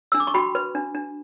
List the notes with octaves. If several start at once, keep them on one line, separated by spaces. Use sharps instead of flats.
E6
D4
D6
C#6
F#4 G5 B5
B4
D4
D4